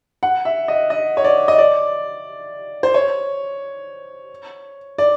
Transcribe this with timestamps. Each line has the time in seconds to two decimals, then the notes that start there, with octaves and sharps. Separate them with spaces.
0.23 F#5
0.45 E5
0.68 D#5
0.90 D#5
1.17 C#5
1.24 D5
1.48 D#5
1.58 D5
2.83 C5
2.94 C#5
4.98 D5